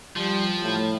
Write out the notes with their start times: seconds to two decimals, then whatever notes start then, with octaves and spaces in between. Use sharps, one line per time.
0.17 F3 G3
0.62 A2